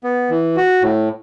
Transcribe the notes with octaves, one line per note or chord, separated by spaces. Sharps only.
B3
E3
F#4
A2